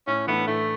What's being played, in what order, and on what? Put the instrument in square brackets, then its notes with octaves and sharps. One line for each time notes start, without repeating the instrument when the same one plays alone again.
[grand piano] A2 [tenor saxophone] C#4
[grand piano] E3 A3 D4 [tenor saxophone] B3
[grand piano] A2 [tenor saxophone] A3